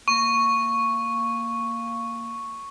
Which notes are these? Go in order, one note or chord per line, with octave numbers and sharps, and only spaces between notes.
A#3 C#6